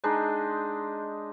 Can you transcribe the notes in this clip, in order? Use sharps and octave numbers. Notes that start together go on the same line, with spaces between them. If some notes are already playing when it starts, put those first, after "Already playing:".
G#3 D4 D#4